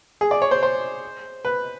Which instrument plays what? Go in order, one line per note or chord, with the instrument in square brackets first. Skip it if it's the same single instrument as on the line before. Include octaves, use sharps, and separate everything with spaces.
[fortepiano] G#4
D5
C#5
C5
C5
B4